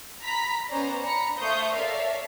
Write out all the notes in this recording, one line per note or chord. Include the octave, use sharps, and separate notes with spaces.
A#5 B5 B6
B3 C#4 B4 C5 D5 A#5
D4 A#5 B5 C#7
A3 C5 F5 C#6 D#6 G6
A4 A#4 C#5 D5 E5 F5